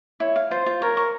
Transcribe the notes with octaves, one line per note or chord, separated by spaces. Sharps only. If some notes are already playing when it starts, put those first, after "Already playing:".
E4 C#5
F5
F4 C5
F4
A#4 C#5
C#6